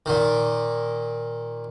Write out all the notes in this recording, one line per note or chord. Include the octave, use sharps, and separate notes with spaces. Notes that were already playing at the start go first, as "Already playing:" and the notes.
A#2 D#3